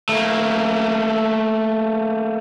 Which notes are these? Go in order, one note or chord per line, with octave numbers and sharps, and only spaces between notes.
A3 A#3